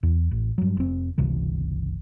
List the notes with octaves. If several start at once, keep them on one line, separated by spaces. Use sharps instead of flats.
E2
A1
G2 F#3
F1 C4
G1 C#2 C3 E3